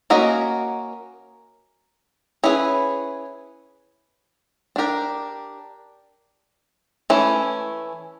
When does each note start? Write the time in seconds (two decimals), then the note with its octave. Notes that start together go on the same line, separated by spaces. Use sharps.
0.10 A#3 C#4 F#4 A#4 D#5
2.44 C#4 E4 G#4 B4
4.76 D4 G4 A#4
7.10 E3 A3 C#4 E4